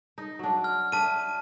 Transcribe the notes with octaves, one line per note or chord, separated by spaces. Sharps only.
D#4
F#3 D4
F6
D4 E5 A5 D#7